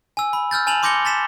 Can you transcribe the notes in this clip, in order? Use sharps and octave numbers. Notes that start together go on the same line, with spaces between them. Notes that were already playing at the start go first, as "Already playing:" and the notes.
G#5 E6
B5
E6 F6 G6 A6
G#5 A5 F7 F#7
C6 D6 G6 A#6 C#7 G7
A5 A6 B6 E7